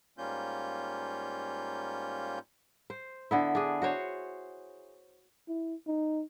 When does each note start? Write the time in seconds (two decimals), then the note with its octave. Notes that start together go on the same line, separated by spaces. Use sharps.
0.18 G#2 G3 A#3 C#4 F4 G6
2.90 C5
3.31 D3 B3 E4
3.55 D4 G#4
3.82 F#4 C5 C#5
5.48 E4
5.87 D#4